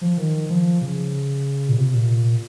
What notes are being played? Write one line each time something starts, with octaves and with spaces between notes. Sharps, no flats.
F3
D#3
F3
C#3
A#2
C3
A#2